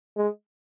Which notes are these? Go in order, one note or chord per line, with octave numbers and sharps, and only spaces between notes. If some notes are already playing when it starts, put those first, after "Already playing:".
G#3